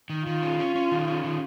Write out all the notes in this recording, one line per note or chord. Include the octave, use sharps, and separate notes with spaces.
D#3
D#3 F4
C#4
C#4
C#4
D#3
C#4
D#3